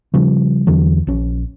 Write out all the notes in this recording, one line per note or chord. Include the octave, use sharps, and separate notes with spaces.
C#3 F3 G3
E2 D3 E3 F#3
A#1 C#4